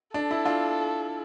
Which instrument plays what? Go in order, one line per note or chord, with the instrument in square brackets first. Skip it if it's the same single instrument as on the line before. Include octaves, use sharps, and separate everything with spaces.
[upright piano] D4 [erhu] A4
[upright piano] E4
D4 F4